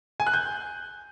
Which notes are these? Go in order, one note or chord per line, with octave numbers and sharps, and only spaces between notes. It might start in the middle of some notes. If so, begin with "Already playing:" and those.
G#5
F#6
G6